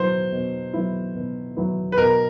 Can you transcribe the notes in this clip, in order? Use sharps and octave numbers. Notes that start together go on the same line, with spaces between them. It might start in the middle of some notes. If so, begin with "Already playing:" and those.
Already playing: B2 F#3 B3 E4 C5
B2
F#3 B3 E4
B2
F#3 B3 E4
B4
B2 A#4